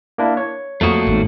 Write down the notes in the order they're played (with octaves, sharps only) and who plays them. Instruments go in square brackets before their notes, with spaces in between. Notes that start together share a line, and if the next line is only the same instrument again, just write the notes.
[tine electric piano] A#3 D4 E4
C#5
[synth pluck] F2 F3 D#6 [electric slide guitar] A3 A#3 F#4
[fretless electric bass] G#1 G#2